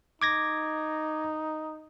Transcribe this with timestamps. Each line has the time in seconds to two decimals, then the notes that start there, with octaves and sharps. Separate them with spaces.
0.22 D#4 D6 G#6 A#6